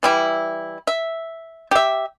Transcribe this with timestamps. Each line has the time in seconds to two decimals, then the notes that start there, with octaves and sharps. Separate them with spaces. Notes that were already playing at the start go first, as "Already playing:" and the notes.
0.03 E3 G3 E4
0.87 E5
1.71 G4 E5